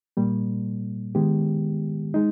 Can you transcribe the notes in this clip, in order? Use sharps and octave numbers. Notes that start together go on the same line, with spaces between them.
A#2 G3 A#3
D#3 G#3 B3 G4
G#3 D#4